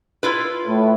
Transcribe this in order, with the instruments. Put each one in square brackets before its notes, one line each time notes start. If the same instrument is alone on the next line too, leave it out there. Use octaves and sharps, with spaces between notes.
[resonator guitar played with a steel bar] E4 F4 B4
[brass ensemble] A2